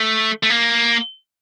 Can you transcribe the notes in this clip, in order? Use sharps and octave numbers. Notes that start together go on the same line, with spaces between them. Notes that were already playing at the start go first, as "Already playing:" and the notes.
Already playing: A3
A3
A#3